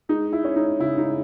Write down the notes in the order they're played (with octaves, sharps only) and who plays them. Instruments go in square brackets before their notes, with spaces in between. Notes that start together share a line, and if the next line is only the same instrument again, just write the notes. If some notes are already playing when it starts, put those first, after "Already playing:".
[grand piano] G#3 D#4
E4
C#4
D#4
C#3 E4
D#4